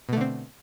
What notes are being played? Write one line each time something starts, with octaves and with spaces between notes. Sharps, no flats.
B2 D3 A3 C4